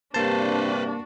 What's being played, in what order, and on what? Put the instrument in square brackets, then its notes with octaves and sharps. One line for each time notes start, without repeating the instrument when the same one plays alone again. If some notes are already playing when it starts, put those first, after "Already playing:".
[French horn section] G2 C3 [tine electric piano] A#3 A5 [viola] D4 F#4 [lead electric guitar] B4 C5